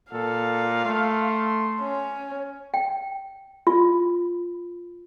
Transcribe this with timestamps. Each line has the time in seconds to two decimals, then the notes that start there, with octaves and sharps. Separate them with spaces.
0.12 A#2 A4 F5
0.85 A3 C6
1.80 C#4
2.74 G5
3.67 F4